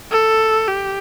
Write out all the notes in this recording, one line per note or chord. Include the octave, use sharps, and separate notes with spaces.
A4
G4